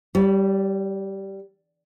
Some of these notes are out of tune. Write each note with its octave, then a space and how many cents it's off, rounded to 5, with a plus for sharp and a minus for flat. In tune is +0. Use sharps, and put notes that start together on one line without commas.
G3 -10 C#5 +35